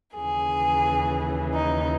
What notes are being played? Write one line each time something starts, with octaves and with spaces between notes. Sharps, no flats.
D#2 C#3 E3 G#4
D#4